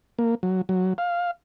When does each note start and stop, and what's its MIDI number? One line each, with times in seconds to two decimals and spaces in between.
0.19 0.35 58
0.43 0.62 54
0.69 0.93 54
0.98 1.31 77